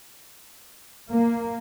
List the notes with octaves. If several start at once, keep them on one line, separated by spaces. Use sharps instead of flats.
A#3